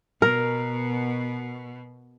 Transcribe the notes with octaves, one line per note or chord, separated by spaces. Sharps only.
B2 A#4